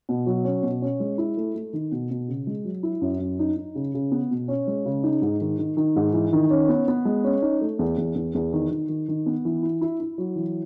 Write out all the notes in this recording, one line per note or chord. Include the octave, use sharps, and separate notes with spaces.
B2
F#3
C#4
B2
C#4
G#3
E4
A3
A3
D#3
B2
B2
C#3
G#3
F#3
E4
F#2
F#2
D#4
D#4
C#3
C#3
B3
B2
C#4
G#3
C#3
D#4
G#2
D#3
D#3
D#3
G#2
E3
D#3
C#4
B3
B3
G#3
C#4
D#4
A3
E2
E2
E2
E2
D#3
D#3
D#3
D#3
B3
E3
E4
E4
E4
F#3
E3